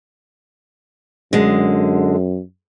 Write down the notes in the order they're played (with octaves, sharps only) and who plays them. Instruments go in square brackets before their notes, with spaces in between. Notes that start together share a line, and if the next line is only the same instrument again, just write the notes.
[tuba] F#2 [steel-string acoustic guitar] D3 G#3